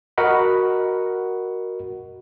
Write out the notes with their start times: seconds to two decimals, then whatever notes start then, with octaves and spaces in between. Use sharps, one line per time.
0.18 F#4 A#4 D#5 F#5 B5